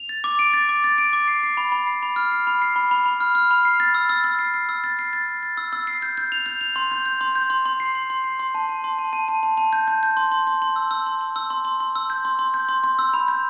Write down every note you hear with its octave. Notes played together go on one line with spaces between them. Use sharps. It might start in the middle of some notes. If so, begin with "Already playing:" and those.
Already playing: F7
A6
D6
D7
A6
D6
A6
D7
D6
C7
C7
B5
B5
C7
B5
F6
C7
B5
C7
B5
B5
B5
F6
F6
B5
C7
A6
E6
E6
E6
C7
C7
E6
A6
C7
A6
C7
A6
E6
E6
C7
G6
G6
F7
G6
F7
C6
G6
G6
C6
G6
C6
C6
C7
C6
C6
C7
C6
A5
A5
C6
A5
A5
A5
A5
A5
G6
G6
G6
C6
C6
C6
C6
E6
E6
C6
C6
E6
C6
C6
C6
E6
G6
C6
C6
G6
C6
C6
E6
B5
G6